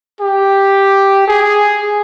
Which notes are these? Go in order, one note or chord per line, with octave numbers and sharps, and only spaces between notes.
G4
G#4